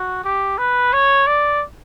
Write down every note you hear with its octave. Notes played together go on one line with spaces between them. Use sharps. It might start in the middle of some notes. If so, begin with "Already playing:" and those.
Already playing: F#4
G4
B4
C#5
D5